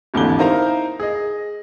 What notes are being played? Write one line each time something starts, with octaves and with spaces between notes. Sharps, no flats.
G#1 D#2 D3 E3 G7
D#4 E4 A#4 C5 F5 A#5
G#4 D#5